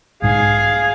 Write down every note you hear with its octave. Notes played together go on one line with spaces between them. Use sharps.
B1 G#2 G#4 F5 G#5